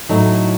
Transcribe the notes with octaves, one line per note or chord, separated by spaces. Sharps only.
A2 F#3 A3 D#4